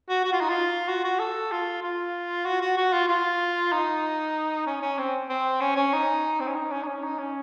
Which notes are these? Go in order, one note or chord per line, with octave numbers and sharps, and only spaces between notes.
F#4
F#4
F4
D#4
F4
F#4
F#4
A4
F4
F4
F#4
F#4
F#4
F4
F4
D#4
C#4
C#4
C4
C4
C#4
C#4
D#4
C4
C#4
D#4
C#4
D#4
C#4
D#4
C#4